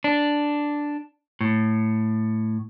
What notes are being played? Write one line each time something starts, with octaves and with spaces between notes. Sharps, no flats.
D4
A2